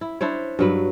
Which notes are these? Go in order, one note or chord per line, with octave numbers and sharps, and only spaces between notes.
E4
D4 E4 C5 C#5
G2 F#3 B4